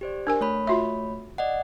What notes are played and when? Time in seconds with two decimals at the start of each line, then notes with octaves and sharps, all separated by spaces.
0.01 G4 C5 D5
0.27 D4 A#4 G#5
0.41 A3 C#5 B5
0.67 F4 F#4 E5
1.38 D5 D#5 F#5